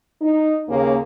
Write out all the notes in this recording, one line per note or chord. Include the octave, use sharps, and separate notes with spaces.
D#4
D#2 C#3 A#3